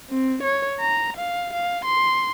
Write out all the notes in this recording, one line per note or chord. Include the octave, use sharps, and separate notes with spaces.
C4
C#5
A#5
F5
F5
C6